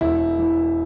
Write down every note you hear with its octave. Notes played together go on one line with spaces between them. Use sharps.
E1 E4
E3